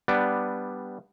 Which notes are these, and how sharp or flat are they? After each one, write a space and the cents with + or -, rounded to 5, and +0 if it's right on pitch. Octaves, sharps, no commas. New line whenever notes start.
G3 +0 B3 +0 D4 +0